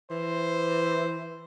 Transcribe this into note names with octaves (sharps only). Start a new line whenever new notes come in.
E3 C5